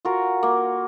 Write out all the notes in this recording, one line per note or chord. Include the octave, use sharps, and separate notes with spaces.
F4 F#4 A#4
A#3